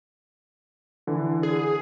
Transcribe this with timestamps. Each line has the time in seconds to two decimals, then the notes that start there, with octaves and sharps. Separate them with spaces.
1.07 D3 E3
1.43 G#4